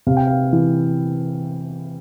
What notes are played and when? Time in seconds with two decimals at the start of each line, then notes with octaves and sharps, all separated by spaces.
0.07 C3 F5
0.17 G5
0.27 F5
0.53 E3